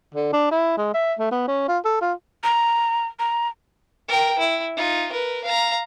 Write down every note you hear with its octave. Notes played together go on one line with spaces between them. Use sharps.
D3
D4
E4
G#3
E5
A3
B3
C#4
F4
A4
F4
A#5
A#5
A#4 G5
E4
D#4 F4
A#4 B4
F5 A#5